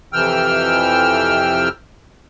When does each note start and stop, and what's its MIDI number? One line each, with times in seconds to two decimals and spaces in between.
0.13 1.69 41
0.13 1.69 48
0.13 1.69 52
0.13 1.69 79
0.13 1.69 88
0.13 1.69 89